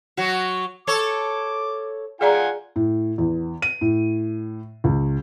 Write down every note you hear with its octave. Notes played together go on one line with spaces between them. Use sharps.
F#3 F#4
A4 C#5 D6
F4 G#4 D5 F#5 G#5 A#5
A2
E2
D#7
A2
C#2